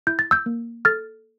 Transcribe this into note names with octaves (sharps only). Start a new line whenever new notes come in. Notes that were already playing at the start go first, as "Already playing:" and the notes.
E4 G6
A6
E6 G6
A#3
A4 F6 A6